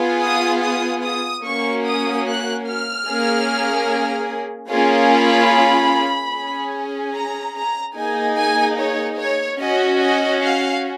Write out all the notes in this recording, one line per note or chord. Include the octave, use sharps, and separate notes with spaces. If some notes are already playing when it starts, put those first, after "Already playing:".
Already playing: B3 F4 G#4
D#6
D#6
D#6
A#3 C#4 F#4 C#6
D#6
F#6
F6
A#3 C#4 G#4
A#3 C#4 F4 G#4
B5
C#4 G#4
A#5
A#5
A#3 D#4 G#4 G#5
G#5
C#5
C#5
C#4 F#4 D#5
D#5
F5